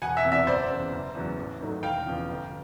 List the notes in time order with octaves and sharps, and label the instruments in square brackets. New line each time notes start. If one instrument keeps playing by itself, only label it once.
[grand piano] E1 F#5 G#5
E5 F#5
E2 C3
D5 E5
F#1 C5 D5
E2 C#3
F#1
E2 C#3 F#3
A1
G#2 D#3 F#3 A3
E1 F5 G5
E2 C#3 F3
G1